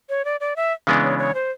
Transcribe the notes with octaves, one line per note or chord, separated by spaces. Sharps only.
C#5
D5
D5
E5
C#3 E3 G#3 B3 D4
C#5
C#5
C5